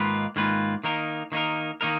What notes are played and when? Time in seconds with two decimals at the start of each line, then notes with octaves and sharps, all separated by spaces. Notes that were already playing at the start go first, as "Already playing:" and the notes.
Already playing: G#2 D#3 A#3 F4 B4
0.36 G#2 D#3 A#3 F4 B4
0.84 D#3 A#3 D#4 A#4
1.32 D#3 A#3 D#4 A#4
1.81 D#3 A#3 D#4 A#4